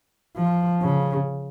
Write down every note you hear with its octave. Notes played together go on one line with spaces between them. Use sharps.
F3
C#3